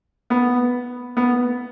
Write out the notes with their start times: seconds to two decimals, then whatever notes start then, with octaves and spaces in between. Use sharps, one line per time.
0.30 B3
1.17 B3